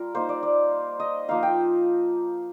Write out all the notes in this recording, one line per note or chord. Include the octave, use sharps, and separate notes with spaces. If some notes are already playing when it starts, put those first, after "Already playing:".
Already playing: G3 F4 A#4
A#3 D#4 C5
D5
D5
D#5
F3 A#3 D#4 F5
G5